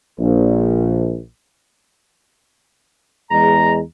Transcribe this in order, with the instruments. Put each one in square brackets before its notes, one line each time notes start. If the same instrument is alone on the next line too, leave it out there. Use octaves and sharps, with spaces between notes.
[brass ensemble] A#1
[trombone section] E2 G#3 [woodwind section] A#5